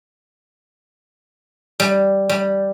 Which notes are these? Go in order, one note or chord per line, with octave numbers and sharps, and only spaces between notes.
G3
G3